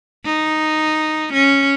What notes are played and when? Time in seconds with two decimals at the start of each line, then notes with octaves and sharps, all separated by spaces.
0.25 D#4
1.33 C#4